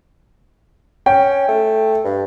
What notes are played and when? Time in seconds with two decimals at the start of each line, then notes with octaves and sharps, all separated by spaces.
1.06 C#4 G5
1.48 A3
2.05 G2